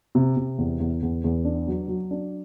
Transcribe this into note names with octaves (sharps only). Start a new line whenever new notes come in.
C3
C3
E2
E2
E2
E2
D4
F#3
F#3
D4